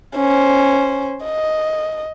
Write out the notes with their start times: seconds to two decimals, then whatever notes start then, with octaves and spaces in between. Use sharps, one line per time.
0.16 C#4 C5
1.24 D#5